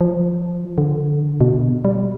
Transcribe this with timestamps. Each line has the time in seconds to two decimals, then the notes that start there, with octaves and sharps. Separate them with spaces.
0.01 F3
0.78 D3
1.41 B2
1.85 G3